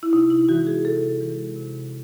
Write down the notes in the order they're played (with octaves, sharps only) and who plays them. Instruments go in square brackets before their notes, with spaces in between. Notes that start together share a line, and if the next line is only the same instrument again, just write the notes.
[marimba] E4
C3 D#4
E4
E3 G#3 F#4
G#4
C3 A4
E3 G#3
C3